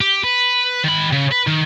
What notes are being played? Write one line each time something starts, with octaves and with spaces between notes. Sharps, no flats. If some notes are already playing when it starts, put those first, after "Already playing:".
G4
B4
D#3 B5
C#3
B4
D#3